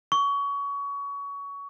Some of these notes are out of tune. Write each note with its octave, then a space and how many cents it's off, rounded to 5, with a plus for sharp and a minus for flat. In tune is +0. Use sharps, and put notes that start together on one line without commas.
C#6 +25